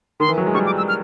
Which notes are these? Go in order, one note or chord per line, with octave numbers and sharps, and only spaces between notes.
D#3 C6
E3
F#3
G#3
G3 C#6
D6
E6
F6